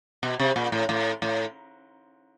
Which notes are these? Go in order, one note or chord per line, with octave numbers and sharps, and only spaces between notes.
B2
C3
A#2
A2
A2
A2